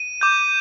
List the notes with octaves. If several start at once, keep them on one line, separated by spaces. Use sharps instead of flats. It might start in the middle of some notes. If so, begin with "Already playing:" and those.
Already playing: D#7
D6 G6